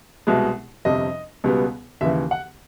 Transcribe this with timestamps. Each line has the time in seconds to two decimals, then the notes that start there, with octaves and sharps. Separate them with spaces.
0.27 C2 B2 G#3
0.85 G1 F2 C3 D#5
1.44 C#2 B2 G3 B3
2.01 D#2 C#3 E3 E5
2.31 F#5